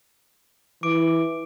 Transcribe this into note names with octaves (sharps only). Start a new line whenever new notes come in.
E3 D6 D7